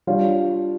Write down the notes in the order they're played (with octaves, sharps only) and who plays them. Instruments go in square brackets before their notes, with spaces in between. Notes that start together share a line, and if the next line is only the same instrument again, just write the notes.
[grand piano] G3 D4 F4 C#5 F5